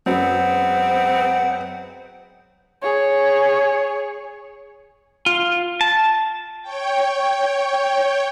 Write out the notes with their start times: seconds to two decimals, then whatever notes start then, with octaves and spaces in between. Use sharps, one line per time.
0.06 F#2 G#3 B3 C4 F#5
2.82 G#4 C#5
5.26 F4
5.81 A5
6.62 C#5 G5